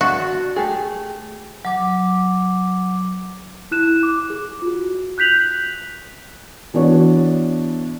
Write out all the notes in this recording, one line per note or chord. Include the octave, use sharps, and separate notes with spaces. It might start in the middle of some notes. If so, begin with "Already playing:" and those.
D4 F#4
A3 G4 G#4
F#3 D6
E4 F#6 E7
D6
G#4
F4 F#4
F#6 G6 B6 F7 F#7
E3 B3 D4 F#4 C#5